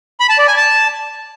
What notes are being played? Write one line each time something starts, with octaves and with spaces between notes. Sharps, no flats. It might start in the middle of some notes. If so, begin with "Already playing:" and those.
B5
A5
D5
G#5
A5